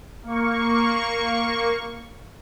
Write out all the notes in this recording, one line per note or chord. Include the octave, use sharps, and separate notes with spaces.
A#3 C#6